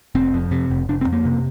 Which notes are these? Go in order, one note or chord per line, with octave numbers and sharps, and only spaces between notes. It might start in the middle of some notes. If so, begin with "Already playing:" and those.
F1 C4
F2
C3
F1
F1 D4
C4
F2
A#3
C3